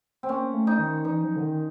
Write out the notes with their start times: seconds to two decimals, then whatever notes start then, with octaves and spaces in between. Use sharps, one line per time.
0.23 C4
0.28 A#3 C#4
0.53 A3
0.67 D#4
0.79 D#3
1.05 E3 D#4
1.24 F3
1.36 D3
1.42 D#3